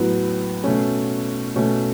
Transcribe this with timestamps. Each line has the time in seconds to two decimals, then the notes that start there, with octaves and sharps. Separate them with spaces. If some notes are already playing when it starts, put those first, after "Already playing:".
Already playing: A2 F#3 B3
0.64 B2 A3 C#4
1.56 B2 A3 C#4